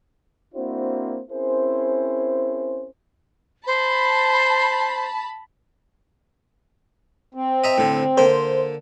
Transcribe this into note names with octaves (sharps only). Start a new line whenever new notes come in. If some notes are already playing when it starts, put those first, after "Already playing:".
A#3 C4 D4 E4 F#4 C5
C4 C#4 E4 G#4 A#4 C5
C5 A5 B5
C4
D#5 E5 A#5
A2 D3
D3 A#3 C5